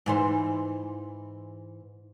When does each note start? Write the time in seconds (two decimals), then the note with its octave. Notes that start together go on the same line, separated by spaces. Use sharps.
0.06 G#2 E3 C5